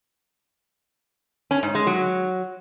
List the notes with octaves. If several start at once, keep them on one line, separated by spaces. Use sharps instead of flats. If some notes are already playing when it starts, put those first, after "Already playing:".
C#4
G#2
G#3
F#3